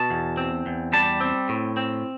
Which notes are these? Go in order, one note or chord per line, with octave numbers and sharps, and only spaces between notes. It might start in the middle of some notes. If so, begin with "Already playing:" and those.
Already playing: B2 A5
E2
C4
E2
G3 A5
C4
A2
C4